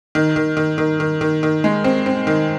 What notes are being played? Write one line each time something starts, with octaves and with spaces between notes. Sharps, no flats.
D#3
D#3
D#3
D#3
D#3
D#3
D#3
G#3
C4
C4
D#3